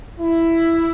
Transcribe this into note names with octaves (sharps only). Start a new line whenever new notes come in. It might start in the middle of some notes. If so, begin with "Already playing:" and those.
E4